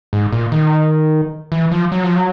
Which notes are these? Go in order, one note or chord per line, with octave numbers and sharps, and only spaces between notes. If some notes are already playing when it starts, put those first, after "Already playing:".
G#2
A#2
D#3
E3
F3
F#3
F3
F#3